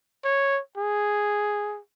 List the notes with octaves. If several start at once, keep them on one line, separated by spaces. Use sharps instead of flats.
C#5
G#4